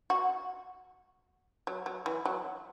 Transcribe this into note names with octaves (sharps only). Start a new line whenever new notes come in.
F#4
F#3
F#3
E3
F#3